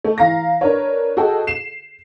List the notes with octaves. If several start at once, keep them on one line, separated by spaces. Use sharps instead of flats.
A3
E3 F5 A#5 A#6
D4 A#4 B4 C#5
F#4 G#4 A4 D#5 G5
C7 E7